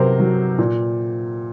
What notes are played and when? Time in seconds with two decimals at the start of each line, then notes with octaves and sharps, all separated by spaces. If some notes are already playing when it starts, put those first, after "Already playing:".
Already playing: C3 F#3 A#4 C5
0.20 F#3
0.58 A#2